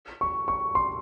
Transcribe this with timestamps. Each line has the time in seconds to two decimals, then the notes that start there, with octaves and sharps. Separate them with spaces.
0.21 C#6
0.48 C#6
0.75 C6